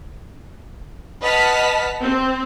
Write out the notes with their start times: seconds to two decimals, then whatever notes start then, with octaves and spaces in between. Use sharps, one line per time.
1.23 B4 D#5 F#5 A5 F6 B6
2.01 C4